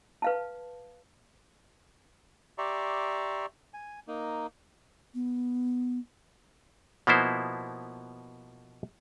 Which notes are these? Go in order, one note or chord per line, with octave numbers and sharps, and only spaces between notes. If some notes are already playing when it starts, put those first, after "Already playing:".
B4 F5 A5
G4 D5 E5 A#5 C6 C#6
G#5
A#3 D#4
B3
B2 F3 A#3 B3 E4 C5